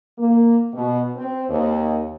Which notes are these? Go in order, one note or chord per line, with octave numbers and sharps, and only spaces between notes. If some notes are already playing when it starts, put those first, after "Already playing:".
A#3
B2
C4
D#2